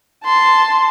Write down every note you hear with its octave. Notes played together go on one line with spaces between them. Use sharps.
A5 C6